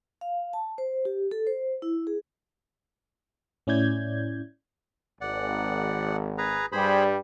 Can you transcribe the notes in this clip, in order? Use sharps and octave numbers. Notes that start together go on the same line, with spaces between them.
F5
A5
C5
G4
A4
C5
E4
G#4
A2 C#4 E4 D5 G6 G#6
G#1 D5 F#5
G#4 B4 A#5
G2 G3 G#4 C5 B5